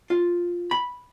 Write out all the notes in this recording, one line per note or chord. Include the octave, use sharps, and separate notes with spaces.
F4
B5